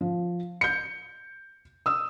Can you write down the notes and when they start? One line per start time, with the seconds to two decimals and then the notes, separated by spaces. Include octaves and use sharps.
0.01 F3
0.61 G6 C#7
1.86 D#6 E6